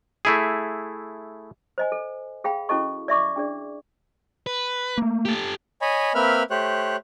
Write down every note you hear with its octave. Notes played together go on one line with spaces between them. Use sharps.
A3 E4 G#4
C5 D#5 G#5
A4
G#4 F5 G5 B5
C#4 E4 F#4 A4 D#5 C#6
D5 E5 C#6 D6
D4 G#4 D5
B4
A3 A#3
G4 A4
C#5 D#5 G#5 B5
A#3 C4 B4 E5 B5 F6
A3 G4 C5 C#5 F#6